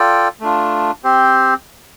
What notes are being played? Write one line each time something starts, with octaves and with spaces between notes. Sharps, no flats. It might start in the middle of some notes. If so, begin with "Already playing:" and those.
Already playing: F4 A4 D5 G5
A3 D4 F4
C4 G4 C5